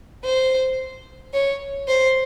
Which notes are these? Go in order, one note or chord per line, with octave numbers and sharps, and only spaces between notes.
C5
C#5
C5